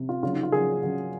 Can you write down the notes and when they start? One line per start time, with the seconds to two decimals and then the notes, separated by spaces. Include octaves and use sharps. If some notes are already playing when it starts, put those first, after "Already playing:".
Already playing: C3
0.09 F4
0.23 C#3 F#3 F4
0.33 D#4
0.43 F4
0.52 C#3 F#3 G#4
0.83 C#3 F#3